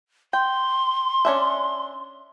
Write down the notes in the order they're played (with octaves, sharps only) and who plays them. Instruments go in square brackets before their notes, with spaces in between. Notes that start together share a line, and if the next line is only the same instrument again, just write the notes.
[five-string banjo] G5 [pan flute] C6
[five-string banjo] C#4 D4 E5